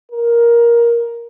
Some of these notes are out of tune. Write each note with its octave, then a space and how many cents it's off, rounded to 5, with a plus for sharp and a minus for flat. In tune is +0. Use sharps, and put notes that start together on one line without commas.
A#4 +10